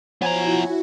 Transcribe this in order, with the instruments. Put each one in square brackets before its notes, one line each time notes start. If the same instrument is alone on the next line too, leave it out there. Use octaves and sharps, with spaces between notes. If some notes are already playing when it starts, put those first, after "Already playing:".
[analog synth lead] F3 [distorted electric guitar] B3 A#5 [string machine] E4 F#4 [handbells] C#5 G#5 G#6